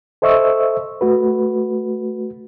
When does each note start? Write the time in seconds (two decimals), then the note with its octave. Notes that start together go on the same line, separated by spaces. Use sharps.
0.22 A4 C5 D#5 E5 C#6 E6
1.01 A3 F#4 B4